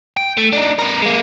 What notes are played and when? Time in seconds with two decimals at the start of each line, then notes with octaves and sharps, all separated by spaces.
0.17 G5
0.37 A3
0.53 D4 D#4
0.79 B3 A#4
1.02 G#3 A#3